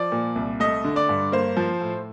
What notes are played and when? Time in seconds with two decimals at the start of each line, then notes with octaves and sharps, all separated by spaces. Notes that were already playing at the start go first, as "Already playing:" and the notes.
Already playing: F3 D5
0.12 A#2
0.36 C2
0.60 A3 D#5
0.84 D3
0.96 D5
1.09 G2
1.32 A#3 C5
1.57 F3
1.81 A2